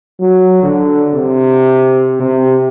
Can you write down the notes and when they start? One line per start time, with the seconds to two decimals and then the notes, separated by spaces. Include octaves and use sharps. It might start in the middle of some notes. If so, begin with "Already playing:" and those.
0.20 F#3
0.63 D3
1.14 C3
2.20 C3